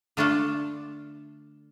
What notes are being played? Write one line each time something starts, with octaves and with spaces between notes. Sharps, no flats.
D3 A3 D4 F4 A4